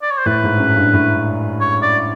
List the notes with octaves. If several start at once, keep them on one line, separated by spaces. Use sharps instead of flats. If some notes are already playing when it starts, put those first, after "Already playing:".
D5
C#5
C5
A2 B4
G#2
F#2
G2
A2
C#5
D5